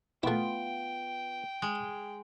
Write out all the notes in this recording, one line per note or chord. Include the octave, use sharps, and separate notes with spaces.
A3 B3 E4 F4 G5
G#3